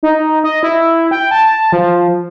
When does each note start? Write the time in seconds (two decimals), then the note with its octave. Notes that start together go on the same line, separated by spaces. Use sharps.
0.03 D#4
0.44 D#5
0.63 E4
1.11 G5
1.31 A5
1.73 F3